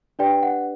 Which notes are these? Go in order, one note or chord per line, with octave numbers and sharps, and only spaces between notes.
D4 G4 B4 D5 G5
F#5